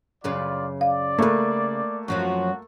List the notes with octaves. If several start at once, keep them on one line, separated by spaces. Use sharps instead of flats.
F#2 C#3 F4 B4 D5
D5 F5
C#3 A3 A#3 B4
F#2 F3 F#3 F#4